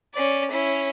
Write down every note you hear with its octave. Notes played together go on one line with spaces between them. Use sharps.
C#4 D5
C#4 E4